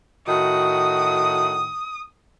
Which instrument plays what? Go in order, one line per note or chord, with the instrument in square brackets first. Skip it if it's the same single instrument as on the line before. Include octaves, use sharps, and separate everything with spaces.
[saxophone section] A2 D#3 F#4 [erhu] D#6